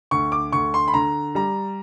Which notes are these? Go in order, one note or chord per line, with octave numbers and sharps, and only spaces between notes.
D2 C#6
D6
D2 C#6
C6
B5
D3 A#5
G3 A#5